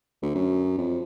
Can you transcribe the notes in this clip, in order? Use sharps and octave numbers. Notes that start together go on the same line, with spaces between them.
D2
F#2
F2